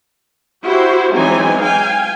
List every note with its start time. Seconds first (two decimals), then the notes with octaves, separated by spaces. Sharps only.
0.63 E4 F#4 G4 C5
1.14 E3 F#3 G#3 C4 D#4 G#5
1.59 F5 G5 G#5